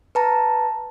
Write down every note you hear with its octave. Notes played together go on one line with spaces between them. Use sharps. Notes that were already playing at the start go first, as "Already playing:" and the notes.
B4 A5 A#5